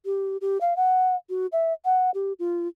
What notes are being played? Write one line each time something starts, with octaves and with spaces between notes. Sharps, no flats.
G4
G4
F5
F#5
F#4
E5
F#5
G4
F4